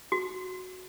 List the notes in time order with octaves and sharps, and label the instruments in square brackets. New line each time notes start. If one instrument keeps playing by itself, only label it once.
[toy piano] F#4